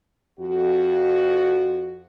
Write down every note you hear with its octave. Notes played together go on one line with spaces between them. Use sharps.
F2 F#4